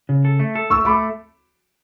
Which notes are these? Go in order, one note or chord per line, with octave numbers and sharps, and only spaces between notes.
C#3
A4
A3
A4
A3 C#6 E6
A3 B5 D6